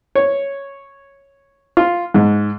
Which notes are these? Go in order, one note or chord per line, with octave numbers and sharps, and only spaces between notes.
C#5
F4
G#2